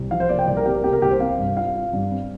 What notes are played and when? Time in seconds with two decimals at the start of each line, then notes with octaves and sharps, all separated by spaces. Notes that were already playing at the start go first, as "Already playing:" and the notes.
Already playing: C2
0.11 F3 F5
0.20 C5
0.29 A#3 D5
0.39 G5
0.47 C2 D5
0.57 A#4
0.66 C3 G4
0.75 A#4
0.84 A#3 G4
0.93 A#4
1.02 C2 G4
1.11 C5
1.20 C4 F5
1.38 G2
1.57 F4 F5
1.75 F4
1.93 G2
2.11 C4